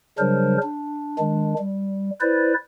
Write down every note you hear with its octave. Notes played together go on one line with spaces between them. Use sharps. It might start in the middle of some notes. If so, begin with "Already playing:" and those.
C#3 F#3 G3 D4 A#4 C5
D4
D#3 G#3 D4
G3
E4 B4 C5 D5